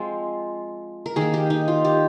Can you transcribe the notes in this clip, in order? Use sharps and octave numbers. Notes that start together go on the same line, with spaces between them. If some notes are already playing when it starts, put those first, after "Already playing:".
Already playing: F3 G#3 C4 F4
A#4
D#3 A#3 G#4
G4
D#4
F4
G4